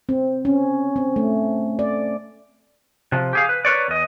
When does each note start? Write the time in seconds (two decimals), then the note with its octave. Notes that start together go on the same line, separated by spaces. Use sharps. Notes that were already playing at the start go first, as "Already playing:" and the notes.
0.09 C4
0.45 C#4
0.96 C4
1.16 A3
1.79 D5
3.12 C3 F3
3.33 G4 G#4 F5
3.49 B4
3.65 A#4 B4 C#5 D5
3.88 E2 D#5